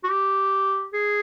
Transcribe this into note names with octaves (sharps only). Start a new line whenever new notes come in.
F#4
G4
G#4